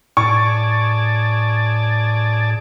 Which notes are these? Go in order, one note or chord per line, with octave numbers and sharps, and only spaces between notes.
A2 G#4 D5 A5 C#6